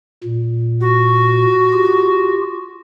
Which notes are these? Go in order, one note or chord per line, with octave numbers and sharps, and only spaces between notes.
A#2
F#4
F4 G4